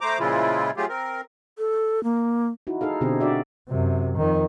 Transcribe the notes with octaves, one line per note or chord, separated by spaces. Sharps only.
A3 C5 A#5 D6
A#2 C#3 F3 G#3 E4 F4
F#3 A3 F4 G4 G#4
C4 A#4
A4
A#3
D#4 E4 F#4
D#4 G#4 A4 F5
B2 D3 C4 G4 G#4
D4 F#4 D5 E5
F#2 C3
F2 D#3